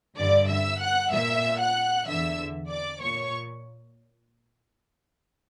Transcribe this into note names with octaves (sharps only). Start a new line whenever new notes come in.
G2 D3 D5 D6
E5 E6
F#5 F#6
A#2 E5 E6
F#5 F#6
E2 D3 E5 E6
D5 D6
A#2 C#5 C#6